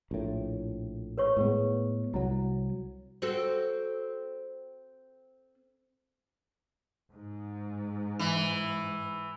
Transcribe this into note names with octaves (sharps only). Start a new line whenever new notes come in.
A#1 A2
B4 C#5 C#6
A2 G#3 B3 B4
C2 F#3 E4
C4 F#4 A4
G#2
E3